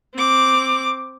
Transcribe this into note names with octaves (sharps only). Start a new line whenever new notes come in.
C4 D6